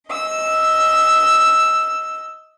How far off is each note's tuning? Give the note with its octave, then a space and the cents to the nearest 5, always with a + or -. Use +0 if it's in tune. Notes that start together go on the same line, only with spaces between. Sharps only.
D#5 +15 E6 +0